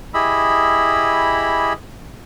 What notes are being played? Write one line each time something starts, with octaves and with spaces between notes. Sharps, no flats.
E4 G4 G#4 D#5 B5 E6